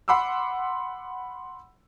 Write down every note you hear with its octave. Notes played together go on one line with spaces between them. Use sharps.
F#5 B5 C6 D6 E6